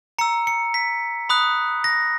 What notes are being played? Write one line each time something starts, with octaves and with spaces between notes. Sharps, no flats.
A#5 E6 C#7
C#7
B6
B5 D#6 F#6
A#6